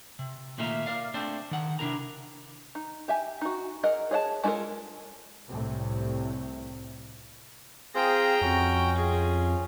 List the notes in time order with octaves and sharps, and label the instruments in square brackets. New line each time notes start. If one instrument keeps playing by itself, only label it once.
[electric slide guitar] C3
A#2 D#3 A3 F4 E5 A#5
A#4 D5 F5
A3 C4 D4 C5 D5
D#3 F#5
C3 D4 E4 A#4 A#5
[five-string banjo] D#4
G4 E5 G#5
D#4 F#4
G#4 A#4 D#5 F#5
G#4 C#5 D#5 F#5 A5
G#3 D4 F4 A4 A#4
[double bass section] C2 A2 C3
[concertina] C4 F4 C5 [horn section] G#4 [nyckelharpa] G5 A#5
[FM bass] F2 [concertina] C#4 [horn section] F#4
[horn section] F4 [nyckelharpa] G#4